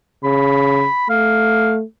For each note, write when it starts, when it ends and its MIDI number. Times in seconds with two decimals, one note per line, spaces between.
0.24 0.86 49
0.24 1.09 83
1.10 1.83 57
1.10 1.74 77